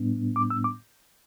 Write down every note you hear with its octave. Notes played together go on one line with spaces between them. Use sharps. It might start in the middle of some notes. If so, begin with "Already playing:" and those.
Already playing: A2 G3 B3 D4
D6
E6
D6